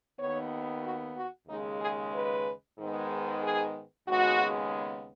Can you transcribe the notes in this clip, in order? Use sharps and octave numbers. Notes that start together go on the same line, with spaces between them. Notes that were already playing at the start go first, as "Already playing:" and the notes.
D#2 D#3 B3 C#5
F#4
F#4
D#2 C#3 G#3 D#4
G#4
B4
G#2 D#3 G#3 B3
G#4
D#2 C#3 G#3 B3 F#4